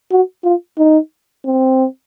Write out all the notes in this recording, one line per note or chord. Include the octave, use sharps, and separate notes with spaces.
F#4
F4
D#4
C4